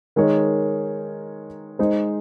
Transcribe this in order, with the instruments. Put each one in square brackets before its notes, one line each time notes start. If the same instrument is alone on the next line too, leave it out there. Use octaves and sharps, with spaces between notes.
[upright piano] D#3 G#3 D#4 A#4 C#5
G#3 D#4 G#4 C5